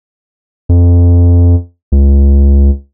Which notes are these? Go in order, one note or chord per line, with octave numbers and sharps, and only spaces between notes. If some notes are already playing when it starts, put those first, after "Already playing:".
F2
C#2